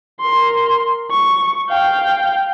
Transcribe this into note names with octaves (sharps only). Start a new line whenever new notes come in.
A#4 C6
C#6
F5 G5